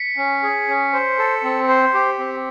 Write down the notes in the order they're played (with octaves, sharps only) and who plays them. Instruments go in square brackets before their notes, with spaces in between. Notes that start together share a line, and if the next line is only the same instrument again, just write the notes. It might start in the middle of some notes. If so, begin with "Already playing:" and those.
Already playing: [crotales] B6 C#7
[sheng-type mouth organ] C#4
G#4
C#4
C5
A4
C4
C5
G4
C4